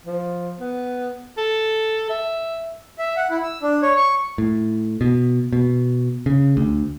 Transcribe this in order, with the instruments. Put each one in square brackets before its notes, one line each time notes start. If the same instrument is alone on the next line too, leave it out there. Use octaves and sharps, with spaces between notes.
[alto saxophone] F3
B3
A4
E5
[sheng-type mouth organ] E5
F#5
E4
E6
D4
C#5
C#6
[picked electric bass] A2
B2
B2
C#3
D2